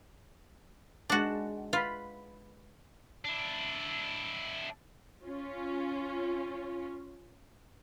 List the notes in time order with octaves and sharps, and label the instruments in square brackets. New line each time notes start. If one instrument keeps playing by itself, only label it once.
[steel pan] G#3 A5 [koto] D4 F#4
[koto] F4 [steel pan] B4 B5
[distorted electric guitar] D4 E4
[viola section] C#4 F4